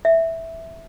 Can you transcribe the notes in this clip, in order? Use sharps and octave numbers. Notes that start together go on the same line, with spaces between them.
E5